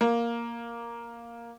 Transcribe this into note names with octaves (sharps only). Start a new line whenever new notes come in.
A#3